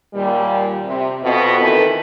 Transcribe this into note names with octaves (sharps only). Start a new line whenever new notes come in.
D#2 A#2 G3 G4
C3
F2 B2
D#3 E3 A4 B4